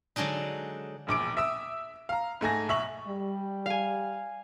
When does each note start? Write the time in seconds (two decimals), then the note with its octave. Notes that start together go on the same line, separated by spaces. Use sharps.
0.16 D3 F#3 G#3 D4 D#4
1.07 E1 A#1 D6 D7
1.37 E5 D#6 E6
2.09 F5 A#5
2.41 G#2 A3 G#5 A#6
2.69 B1 E5 C#6 F#7
3.08 G3
3.66 F5 G#5